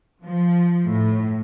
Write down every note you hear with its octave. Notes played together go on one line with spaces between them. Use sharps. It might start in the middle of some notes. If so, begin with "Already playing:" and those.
F3
A2